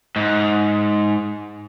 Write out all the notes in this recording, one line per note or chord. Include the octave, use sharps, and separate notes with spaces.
G#2